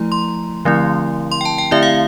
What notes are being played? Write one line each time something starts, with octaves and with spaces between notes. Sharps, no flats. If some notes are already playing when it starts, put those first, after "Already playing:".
Already playing: F3 A3 E4 A#5
C6
D3 F3 A3 C4 E4
C6
G5
A5
G5
D3 A3 C4 E4 E5
F5